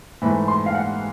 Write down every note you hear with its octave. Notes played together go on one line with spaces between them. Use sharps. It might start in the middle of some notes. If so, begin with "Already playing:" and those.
G#2 E3 A3 B5
C6
F5
F#5